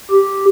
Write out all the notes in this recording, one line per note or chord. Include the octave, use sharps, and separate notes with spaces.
G4